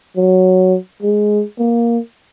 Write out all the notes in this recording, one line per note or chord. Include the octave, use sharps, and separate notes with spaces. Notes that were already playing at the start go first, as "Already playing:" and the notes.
F#3
G#3
A#3